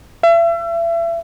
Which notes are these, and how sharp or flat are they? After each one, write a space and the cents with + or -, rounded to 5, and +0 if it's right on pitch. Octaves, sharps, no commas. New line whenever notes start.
E5 +35